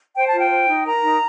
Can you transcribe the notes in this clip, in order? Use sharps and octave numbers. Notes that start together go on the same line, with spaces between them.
C5 G5
A5
F4
G5
C5
D#4
A#4 A#5
D#4